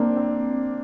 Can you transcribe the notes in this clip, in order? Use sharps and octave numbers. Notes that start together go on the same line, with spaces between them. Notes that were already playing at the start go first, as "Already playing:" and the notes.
Already playing: A#3 C4 D4
C4